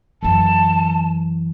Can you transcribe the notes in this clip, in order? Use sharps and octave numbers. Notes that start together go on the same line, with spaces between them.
F#2 E3 A5